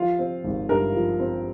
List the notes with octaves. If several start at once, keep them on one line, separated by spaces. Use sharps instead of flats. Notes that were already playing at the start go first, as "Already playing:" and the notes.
Already playing: F3 F4 F5
C4
G#1
G2 A#4 A#5
F3
C4